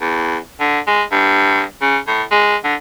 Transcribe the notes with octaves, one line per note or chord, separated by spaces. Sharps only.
E2
D3
G#3
G2
C#3
A2
G#3
D3